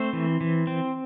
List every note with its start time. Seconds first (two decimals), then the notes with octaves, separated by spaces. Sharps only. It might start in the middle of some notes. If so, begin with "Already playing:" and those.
Already playing: A3 C4 C5
0.13 E3
0.41 E3
0.67 C4